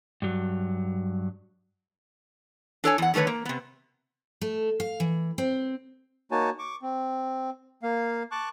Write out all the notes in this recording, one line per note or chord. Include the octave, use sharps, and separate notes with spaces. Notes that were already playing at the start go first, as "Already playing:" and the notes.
G2 F#3
D4 A4 C#5 G#5
E2 F#5
D3 D#3 A3 B4 C#5
A#3
C3 B3
A3
F5
E3
C4
A#3 D#4 F#4 C#5 G#5 A5
C#6 D6
C4
A#3 F5
A5 C#6 D6 F#6